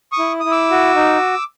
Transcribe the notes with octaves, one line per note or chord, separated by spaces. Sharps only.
C#6 D#6
E4
E4 D#6
D6 E6
F#4
D#4